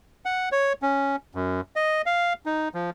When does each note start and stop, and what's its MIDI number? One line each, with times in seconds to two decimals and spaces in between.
0.25 0.49 78
0.52 0.73 73
0.82 1.16 61
1.35 1.61 42
1.76 2.02 75
2.06 2.33 77
2.46 2.69 63
2.74 2.90 53